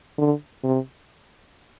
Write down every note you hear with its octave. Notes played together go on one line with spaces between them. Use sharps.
D3
C3